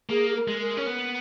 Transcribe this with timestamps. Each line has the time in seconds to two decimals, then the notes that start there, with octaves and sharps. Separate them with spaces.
0.10 A#3 G#4
0.30 G#4
0.36 A#4
0.48 G#3
0.62 A#4
0.77 C#4
0.86 B3